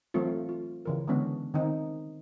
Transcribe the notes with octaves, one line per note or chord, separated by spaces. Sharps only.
E3 F#3 A3 C4 F4
F4
C#3 E3 A#4
D3 E3 G#3 B3 C#4 D4
D#3 C4 D#4